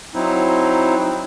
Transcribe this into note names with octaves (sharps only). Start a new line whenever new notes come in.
F#3 C4 D#4 E4